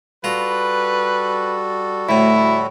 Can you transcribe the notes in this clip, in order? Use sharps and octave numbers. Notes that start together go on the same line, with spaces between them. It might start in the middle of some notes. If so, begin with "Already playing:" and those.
G3 F4 F#4 A4 B4 A#5
D2 A2 E4